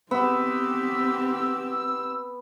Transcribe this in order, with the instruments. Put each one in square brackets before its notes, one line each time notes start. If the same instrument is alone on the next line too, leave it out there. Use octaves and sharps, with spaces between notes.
[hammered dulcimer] B3 [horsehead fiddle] C4 G4 [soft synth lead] E6